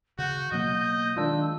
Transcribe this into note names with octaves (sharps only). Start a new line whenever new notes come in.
C#3 F#4 G6
B2 F#3 A#3 D#5
D#3 G#3 D4 F4 E6